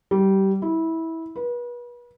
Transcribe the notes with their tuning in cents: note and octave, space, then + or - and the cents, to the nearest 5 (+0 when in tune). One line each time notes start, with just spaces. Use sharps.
G3 -20
E4 -20
B4 -35